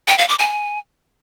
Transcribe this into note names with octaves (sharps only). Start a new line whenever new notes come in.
G5
F5
D6
G#5